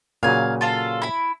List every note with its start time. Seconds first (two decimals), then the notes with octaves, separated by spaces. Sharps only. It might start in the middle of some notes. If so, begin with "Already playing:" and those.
0.23 A#2 C#3 F#3 F5 G#5
0.61 F4 A4 F5
1.02 E4 B5